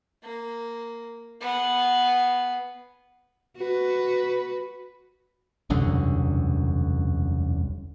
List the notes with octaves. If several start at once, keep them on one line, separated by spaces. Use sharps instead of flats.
A#3
B3 G#4
F#4 B4
E1 C2 F#2 D3